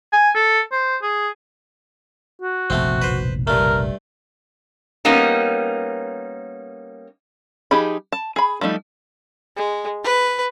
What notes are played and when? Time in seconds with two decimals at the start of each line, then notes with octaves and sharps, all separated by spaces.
0.13 G#5
0.35 A4
0.72 C5
1.02 G#4
2.42 F#4
2.70 F1 A#1 B2 A3 C4
3.02 B4 C5
3.47 G2 A3 A#4
5.05 G3 A#3 B3 C#4 D#4
7.71 F3 D#4 G4 G#4 B5
8.12 A5
8.36 G#4 B5
8.61 F3 G3 A3 D#4
9.56 G#3
10.04 B4